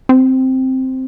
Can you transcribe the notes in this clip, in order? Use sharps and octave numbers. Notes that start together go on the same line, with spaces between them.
C4